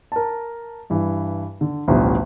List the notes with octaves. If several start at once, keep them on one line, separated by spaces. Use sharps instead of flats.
A#4 A5
G2 E3
D3
A1 D2 B2 D3 F3 G3